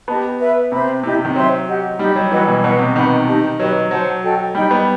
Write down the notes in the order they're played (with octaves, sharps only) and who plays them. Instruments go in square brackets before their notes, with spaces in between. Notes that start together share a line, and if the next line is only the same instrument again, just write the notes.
[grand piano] B3 [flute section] G4 D#5 A5
[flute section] B4 E5 B5
[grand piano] C3 [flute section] C5 E5 B5
[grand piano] C3 [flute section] E4 G4 D#5
[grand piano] C3
D#3
[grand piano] F#3 [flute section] C5 E5 G5 C6
[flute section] G4 D#5 F#5
[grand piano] G3 [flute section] D#4 G4 D#5
[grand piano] F#3
[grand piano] E3 [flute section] F#4 B4 D#5 F#5
[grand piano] B2
[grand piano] B2 [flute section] B4 D#5 F#5
[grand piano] C3
[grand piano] D#3 [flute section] B4 F#5 B5
[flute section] D#4 G4 D#5 A5
[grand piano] F#3 [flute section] G4 B4 D#5
[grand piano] F#3 [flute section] C5 F#5 A5
[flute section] F#4 A4 D#5 G5
[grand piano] G3 [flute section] D#4 G4 D#5 G5
[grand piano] B3